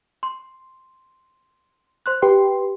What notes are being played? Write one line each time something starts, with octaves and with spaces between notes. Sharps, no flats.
C6
C5 C6 F#6
G4 B4 G5 C6